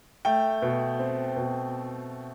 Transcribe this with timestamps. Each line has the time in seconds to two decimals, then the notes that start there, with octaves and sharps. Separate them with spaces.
0.25 A3 G5
0.62 B2
0.99 C4
1.37 B2